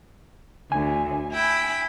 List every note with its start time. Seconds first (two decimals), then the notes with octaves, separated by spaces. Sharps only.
0.72 D2 G#5
1.32 E4 G5 B5